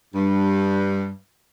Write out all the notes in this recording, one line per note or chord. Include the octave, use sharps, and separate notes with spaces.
G2